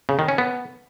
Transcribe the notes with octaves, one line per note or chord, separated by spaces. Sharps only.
C#3
D#3
C#4
B3